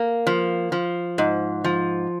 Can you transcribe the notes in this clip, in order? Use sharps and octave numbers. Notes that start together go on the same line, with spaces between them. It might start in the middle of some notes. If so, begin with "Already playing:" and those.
Already playing: A#3
F3
F3
G#2
F3